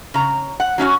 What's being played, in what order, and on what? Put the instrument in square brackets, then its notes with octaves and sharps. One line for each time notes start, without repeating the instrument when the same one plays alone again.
[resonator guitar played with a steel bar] C#3 A#5
F#5
F#3 C#4 E4 F#4